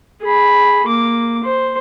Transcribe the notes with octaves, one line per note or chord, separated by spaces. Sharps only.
G#4 B5
A#3 D6
C5